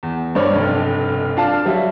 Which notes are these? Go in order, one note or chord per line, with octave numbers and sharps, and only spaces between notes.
E2
G2 C#5 D5
F1 B1 G2
D4 F4 F5 A5
F#3 G3 F#4 E5